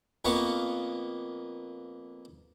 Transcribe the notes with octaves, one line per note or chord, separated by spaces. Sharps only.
F2 A#3 B3 F5 C#6